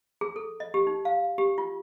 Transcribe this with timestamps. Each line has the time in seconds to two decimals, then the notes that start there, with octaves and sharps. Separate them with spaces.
0.21 G#4
0.36 A4
0.60 D#5
0.74 G4
0.87 D#4
1.05 F5
1.38 G4
1.58 F4